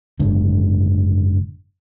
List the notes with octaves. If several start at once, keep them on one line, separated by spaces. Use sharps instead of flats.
F#1 G#2 D3